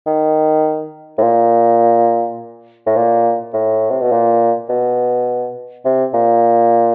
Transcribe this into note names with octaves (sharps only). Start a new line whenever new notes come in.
D#3
A2
A#2
A2
A#2
A2
C3
B2
A#2
B2
C3
A#2